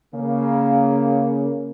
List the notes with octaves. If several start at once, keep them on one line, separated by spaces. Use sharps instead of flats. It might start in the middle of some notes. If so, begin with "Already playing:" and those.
C#3 A#3